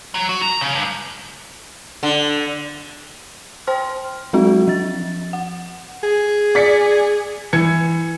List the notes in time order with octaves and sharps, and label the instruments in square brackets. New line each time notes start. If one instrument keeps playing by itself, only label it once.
[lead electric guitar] F#3
F#4
A#5
C#3
G2
[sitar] D3
[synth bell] C5 G5 C6 F6
F#3 G#3 C4 F#4
F3 A6
F#5
[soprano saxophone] G#4
[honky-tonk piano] D5 B6 C#7
E3 G#6 C#7